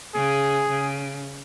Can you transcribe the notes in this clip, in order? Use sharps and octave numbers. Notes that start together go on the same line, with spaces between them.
C#3 G#4
C#3